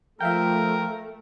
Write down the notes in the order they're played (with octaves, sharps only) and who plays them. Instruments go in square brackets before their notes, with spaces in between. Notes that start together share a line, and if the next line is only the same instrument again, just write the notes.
[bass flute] F3 [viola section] A3 [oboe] A#4 [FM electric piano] E5 F5 G5